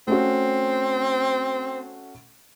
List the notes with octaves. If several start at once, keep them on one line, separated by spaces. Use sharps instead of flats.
A3 C4 C#4 F#4